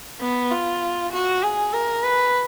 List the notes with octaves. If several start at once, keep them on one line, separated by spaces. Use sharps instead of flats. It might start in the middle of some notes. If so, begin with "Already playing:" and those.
B3
F4
F#4
G#4
A#4
B4